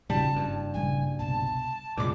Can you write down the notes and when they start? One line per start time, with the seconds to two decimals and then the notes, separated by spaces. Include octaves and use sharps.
0.10 D#1 G#1 C#3 G3 A5
0.34 F#1 G2
0.74 A#1 C#3 G3 G#5
1.19 C2 B2 A5
1.97 C#2 G2 B2 D6